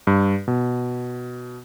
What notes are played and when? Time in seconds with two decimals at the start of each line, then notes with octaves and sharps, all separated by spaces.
0.07 G2
0.48 B2